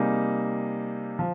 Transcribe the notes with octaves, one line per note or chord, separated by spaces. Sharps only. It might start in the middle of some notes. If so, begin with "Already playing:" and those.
Already playing: C3 G3 A#3 D#4 G#4
F3